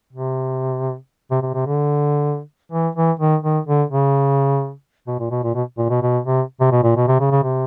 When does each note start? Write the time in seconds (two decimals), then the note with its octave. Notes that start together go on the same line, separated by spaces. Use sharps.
0.13 C3
1.31 C3
1.42 C3
1.54 C3
1.66 D3
2.72 E3
2.95 E3
3.19 D#3
3.43 D#3
3.67 D3
3.90 C#3
5.07 B2
5.19 A#2
5.30 B2
5.43 A#2
5.54 B2
5.78 A#2
5.90 B2
6.02 B2
6.25 C3
6.60 C3
6.72 B2
6.83 A#2
6.96 B2
7.07 C3
7.19 C#3
7.31 C#3
7.43 C3